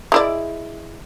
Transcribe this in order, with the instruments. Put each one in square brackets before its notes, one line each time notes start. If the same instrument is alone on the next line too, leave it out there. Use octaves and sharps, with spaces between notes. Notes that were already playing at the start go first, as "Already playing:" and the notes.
[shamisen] G#3 E4 D5